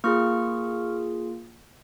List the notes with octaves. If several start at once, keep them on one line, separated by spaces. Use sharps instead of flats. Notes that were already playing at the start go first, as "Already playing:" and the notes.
A#3 F4 G#4 C#6 F6